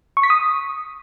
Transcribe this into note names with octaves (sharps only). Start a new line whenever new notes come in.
C#6
B6
D#6